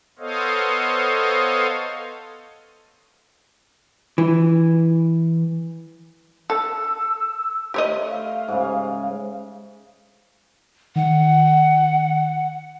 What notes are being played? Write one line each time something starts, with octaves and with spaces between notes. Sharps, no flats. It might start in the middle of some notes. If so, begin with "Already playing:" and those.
B3 A4 C5 C#5 D#5 F5
E3
A4 E6
A3 G4 C#5 D#5 C6
F5
G#2 C#3
D#3 F#5